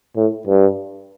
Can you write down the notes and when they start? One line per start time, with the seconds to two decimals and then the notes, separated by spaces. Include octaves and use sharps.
0.16 A2
0.47 G2